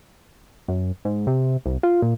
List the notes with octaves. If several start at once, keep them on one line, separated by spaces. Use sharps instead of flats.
F#2
G#2
C3
C2
F4
A#2